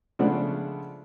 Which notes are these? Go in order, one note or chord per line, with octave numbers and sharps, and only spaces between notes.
C#3 F3 G#3 A3 B3 D4